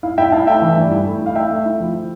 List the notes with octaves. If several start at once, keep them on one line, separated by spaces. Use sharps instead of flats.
E4 F5
E4 E5 G5
E4 F5 A5
A3 E5 G5
E3
G2
E4
A3
E4 F5
E4 E5 G5
A3
E4
F3